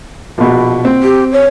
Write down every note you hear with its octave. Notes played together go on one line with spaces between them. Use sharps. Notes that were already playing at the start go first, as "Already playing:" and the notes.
A#1 B2
C4
G4
C#5